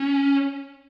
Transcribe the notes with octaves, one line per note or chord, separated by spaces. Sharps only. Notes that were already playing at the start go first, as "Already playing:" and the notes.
Already playing: C#4